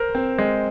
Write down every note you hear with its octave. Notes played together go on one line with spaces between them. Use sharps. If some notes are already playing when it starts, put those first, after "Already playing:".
Already playing: A#4 C5
C4
G#3